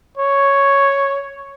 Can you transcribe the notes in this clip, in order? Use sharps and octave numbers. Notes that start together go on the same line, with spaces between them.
C#5